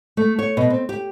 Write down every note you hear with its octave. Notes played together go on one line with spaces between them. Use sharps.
A3
C#5
B2
C4
G4